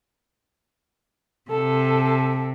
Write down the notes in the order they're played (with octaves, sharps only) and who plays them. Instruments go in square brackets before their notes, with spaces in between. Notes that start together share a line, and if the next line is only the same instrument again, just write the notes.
[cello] C3 [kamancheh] A4